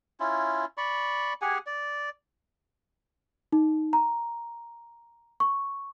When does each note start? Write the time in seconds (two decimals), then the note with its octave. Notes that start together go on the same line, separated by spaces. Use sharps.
0.20 C#4 E4 F4
0.77 D5 B5 C#6
1.42 G4 G#4 F#5 G#5
1.67 D5
3.52 D#4
3.93 A#5
5.40 C#6